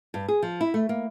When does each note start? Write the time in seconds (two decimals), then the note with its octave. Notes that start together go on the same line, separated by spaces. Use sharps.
0.14 G2
0.28 G#4
0.43 F3
0.61 E4
0.74 A3
0.89 A#3